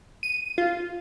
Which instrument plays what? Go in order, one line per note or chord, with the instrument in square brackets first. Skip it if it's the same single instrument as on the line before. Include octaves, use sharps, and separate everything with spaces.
[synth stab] D#7
F4